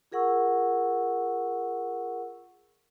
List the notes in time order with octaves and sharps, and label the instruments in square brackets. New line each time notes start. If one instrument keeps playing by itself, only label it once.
[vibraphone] F4 G#4 A#4 F#5 C#6 E6